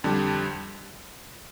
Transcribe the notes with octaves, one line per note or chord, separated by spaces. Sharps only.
F2 D3 G3